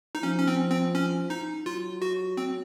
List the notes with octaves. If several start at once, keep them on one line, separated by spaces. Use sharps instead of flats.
D#4
F3 C#4
C#4
C4
C4
C#4
D#4
F#3 F4
F#4
C4